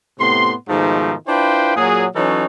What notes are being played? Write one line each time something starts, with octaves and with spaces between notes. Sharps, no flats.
A2 C3 B3 C6
G#2 B2 D#3 F3 A3 D#4
D4 E4 F4 B4 C5 G5
A#2 F#3 G#4
E3 F#3 C#4 D#4 A4 C#5